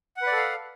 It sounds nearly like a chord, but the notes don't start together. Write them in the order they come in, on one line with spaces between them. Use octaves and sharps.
F#5 B4 D5 A4 F5